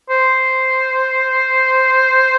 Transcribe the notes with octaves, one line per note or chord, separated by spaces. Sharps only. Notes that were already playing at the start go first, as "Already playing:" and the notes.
C5